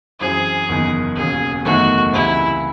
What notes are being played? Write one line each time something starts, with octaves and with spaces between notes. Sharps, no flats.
F#2 E3 C4 G#4
F#1 E2 D#3
E1 D#2 C#3 G#4
F#1 E2 D#3 A3 D#4 F#4
C#2 C3 E3 E4